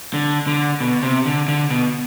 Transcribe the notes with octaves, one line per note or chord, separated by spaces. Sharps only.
D3
D3
B2
C3
D3
D3
B2